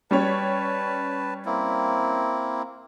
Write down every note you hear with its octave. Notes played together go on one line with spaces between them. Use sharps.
G3 C#4 B4 C#5 A5
A#3 C4 E4